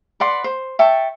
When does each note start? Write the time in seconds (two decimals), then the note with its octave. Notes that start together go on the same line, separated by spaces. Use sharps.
0.20 B4 D5 F#5 C6
0.44 C5
0.79 E5 G5 A5 C#6